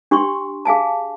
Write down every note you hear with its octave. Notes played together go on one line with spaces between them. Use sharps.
D4 G4 G5 C6 C#6
G#4 F5 G#5 A5